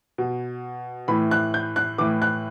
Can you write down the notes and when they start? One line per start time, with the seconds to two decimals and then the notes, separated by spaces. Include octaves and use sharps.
0.18 B2
1.08 A2 E3 B5
1.31 F#6
1.54 G6
1.76 F#6
1.98 A2 E3 D6
2.22 F#6